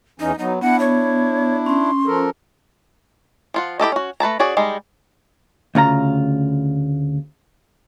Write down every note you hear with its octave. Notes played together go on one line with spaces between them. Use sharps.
E2 E3 C#4 D#4
F#3 B3 D#4
B3 D4 E4 F#5
C#5
C#4 C6
F3 A4 A#4
F3 F4 F#5
E4 G4 A4 D#5
C#4 F#4
A3 B4 A5 A#5
C#4 F#4 G#4 D5
G3 G#3 D#4
D2 C#3 F4 A#5